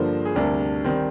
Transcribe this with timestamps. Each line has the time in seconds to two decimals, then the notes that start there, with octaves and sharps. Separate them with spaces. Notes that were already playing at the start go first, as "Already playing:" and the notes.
Already playing: G2 D3 F3 A#3 C5
0.25 G#4
0.35 D2 C3 G3 D4 A#4
0.84 D#3 G3 C4